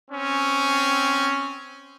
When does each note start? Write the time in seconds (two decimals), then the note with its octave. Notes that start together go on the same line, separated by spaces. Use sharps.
0.11 C4 C#4